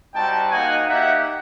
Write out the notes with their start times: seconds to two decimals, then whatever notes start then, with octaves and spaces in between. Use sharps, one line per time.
0.14 G3 C4 D#4 F#4 G5 A5
0.50 A#3 D#4 F#4 F#5 G#5
0.87 A#3 D#4 G4 E5 F#5